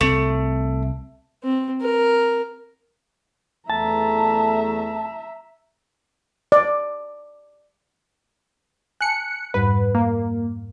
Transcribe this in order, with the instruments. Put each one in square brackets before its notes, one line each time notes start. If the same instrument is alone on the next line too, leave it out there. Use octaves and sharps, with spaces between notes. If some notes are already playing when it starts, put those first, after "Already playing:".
[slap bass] C2 C4 [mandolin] A3
[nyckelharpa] C4
A#4
[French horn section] E2 A3 [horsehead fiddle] E5 A#5 [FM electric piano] A5
[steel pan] D5
[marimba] G#5 A5 [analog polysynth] F#6 C#7
[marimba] F2 G#2 G3 [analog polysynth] B4
[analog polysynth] A#3